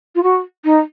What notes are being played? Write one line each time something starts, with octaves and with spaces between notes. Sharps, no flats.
F4
F#4
D#4